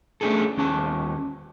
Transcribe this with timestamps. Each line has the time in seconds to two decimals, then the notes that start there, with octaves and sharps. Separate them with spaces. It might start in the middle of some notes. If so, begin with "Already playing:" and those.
0.21 A3 C#4 D4 G#4 A4
0.57 D#2 C#4 A5